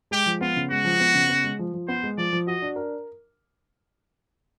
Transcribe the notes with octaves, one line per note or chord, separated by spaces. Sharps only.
G#3 G4
F3
B3 F4
C#3
G#3 F#4
F3
B3
C#3
B3
G#3
F3
F3
B3 C5
G#3
F3 D5
F3
F#4 D#5
D4
A#4